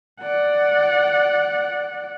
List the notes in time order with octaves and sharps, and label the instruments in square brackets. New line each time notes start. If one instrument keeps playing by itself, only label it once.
[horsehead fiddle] D5 F#5